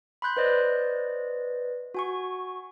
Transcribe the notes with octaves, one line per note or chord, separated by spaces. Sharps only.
B5 C6 F#6 G6
B4 C5 D5 D#5
F#4 G#5 C#6